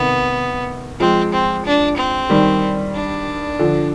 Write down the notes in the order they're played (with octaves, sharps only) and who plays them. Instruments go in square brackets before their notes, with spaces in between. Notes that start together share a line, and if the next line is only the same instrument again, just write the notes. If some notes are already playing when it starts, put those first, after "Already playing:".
Already playing: [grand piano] C3 D#3 [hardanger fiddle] B3
[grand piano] F3 G#3 [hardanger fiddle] C4
[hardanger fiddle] C4
D4
C4
[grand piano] D#3 G3
[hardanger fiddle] D4
[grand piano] D3 F3